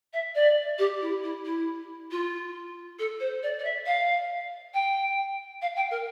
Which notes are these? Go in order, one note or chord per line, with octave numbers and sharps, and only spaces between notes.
E5
D5
G4
E4
E4
E4
F4
A4
C5
D5
D5
E5
F5
G5
F5
G5
A#4